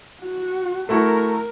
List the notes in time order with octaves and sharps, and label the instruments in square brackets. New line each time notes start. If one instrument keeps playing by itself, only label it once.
[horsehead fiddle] F#4
[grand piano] A3 E4 F#4 [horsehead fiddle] A#4